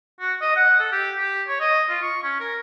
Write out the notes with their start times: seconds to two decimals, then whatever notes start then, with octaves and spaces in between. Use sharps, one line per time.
0.20 F#4
0.42 D#5
0.56 F#5
0.79 A4
0.92 G4
1.18 G4
1.48 C#5
1.60 D#5
1.89 F4
2.02 C#6
2.23 C#4
2.40 A#4